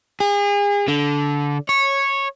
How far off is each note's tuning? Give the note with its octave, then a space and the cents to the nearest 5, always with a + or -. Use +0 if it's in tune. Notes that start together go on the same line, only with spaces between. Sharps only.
G#4 -35
D3 -20
C#5 -10